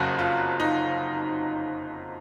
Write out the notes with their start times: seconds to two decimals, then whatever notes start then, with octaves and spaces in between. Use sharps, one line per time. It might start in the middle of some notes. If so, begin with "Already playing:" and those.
Already playing: F#1 F2 C#3 F#3 F#4
0.19 F4
0.60 D#4